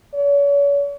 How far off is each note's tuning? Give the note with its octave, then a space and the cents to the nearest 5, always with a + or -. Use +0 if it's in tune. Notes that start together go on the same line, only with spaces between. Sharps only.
C#5 +40